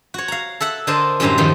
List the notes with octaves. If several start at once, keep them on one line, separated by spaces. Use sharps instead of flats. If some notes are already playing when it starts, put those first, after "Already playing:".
F#4 C#5
F5 A#5
A4 E5 F#5
D3 D4 A#4 C5 D#5 A5
F#2 A2 D3 G3 C5 A#5
G2 D#3 F3